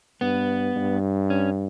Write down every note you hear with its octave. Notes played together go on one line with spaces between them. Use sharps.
G2 B3
G2
C#4